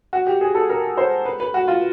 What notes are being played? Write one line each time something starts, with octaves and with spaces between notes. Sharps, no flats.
F#4
G4
G#4
A4
A#4
C5
B4
B4
F#4
F4